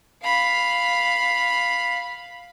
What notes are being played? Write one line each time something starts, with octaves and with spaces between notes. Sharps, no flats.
F5 B5